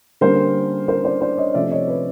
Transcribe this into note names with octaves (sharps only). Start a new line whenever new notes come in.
D3 G3 A#3 C#4 A#4 C5
A#4 C5
C5 D5
C5 D5
C#5 D#5
C3 F3 A3 C#4 D5 E5
C#5 D#5
B4 C#5